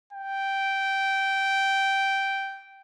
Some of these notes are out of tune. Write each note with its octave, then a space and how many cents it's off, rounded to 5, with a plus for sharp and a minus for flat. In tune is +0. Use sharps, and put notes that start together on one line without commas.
G5 -10